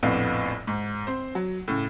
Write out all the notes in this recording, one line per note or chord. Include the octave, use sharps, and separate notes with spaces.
A#1 F2 A2 B3 F5
G#2
C4 C5
F#3
A2 C#3